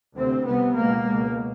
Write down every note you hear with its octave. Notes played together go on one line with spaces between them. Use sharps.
D2 C3 C4
C2 C3 B3
C#2 B2 A#3
C#2 B2